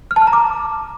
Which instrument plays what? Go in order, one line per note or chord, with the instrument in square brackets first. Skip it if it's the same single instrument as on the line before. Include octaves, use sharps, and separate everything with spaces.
[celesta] F6
A5
F6
A#5
D6